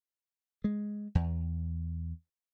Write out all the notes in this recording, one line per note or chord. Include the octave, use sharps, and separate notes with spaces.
G#3
E2